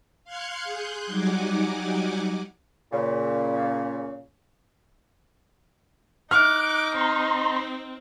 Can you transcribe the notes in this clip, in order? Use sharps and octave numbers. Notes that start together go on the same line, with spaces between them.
F5 C6 F6 F#6 G#6 C#7
G#4 C6 F#6 G6
F#3 G3 D#4 F#5 G#5 D6
A#2 C#3
D#4 D6 F6 F#6
C4 A#5 C6